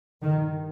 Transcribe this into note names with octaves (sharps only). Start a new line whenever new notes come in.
G2 D#3